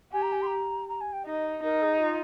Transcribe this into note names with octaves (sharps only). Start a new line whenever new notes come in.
G4 G#5
A#5
G#5
C6
A#5
A#5
G#5
G5
D#4 D#5
D#4 A#4
G#4
F4